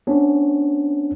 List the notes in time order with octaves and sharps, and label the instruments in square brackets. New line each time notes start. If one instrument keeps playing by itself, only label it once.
[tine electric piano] B3 C#4 D4